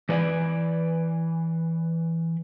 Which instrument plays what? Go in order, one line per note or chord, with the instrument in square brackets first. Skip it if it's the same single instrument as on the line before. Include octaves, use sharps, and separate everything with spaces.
[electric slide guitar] E3 B4 D5 E5 G#5